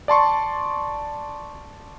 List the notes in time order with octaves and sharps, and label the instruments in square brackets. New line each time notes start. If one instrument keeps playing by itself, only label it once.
[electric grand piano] D5 A5 C6 C#6